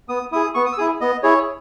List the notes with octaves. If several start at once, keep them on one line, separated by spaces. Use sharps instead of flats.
B3 D#6
E4 G#4 D#6
B3 C#6
D#6
E6
E4 G#4 D#6
B3 D#5
E4 G#4 C#5